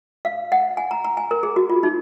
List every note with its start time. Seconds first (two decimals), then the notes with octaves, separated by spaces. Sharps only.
0.25 F5
0.52 F#5
0.77 G#5
0.91 A#5
1.04 A#5
1.17 G#5
1.31 A#4
1.43 G#4
1.56 F#4
1.70 F4
1.83 D#4